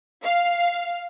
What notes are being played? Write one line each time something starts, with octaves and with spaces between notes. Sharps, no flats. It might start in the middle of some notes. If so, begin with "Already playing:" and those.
F5